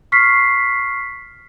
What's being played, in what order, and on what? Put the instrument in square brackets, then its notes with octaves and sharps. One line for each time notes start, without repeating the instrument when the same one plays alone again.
[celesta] C#6 F6 B6 C7